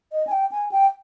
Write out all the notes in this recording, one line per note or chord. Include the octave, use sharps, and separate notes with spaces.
D#5
G#5
G5
G#5
G5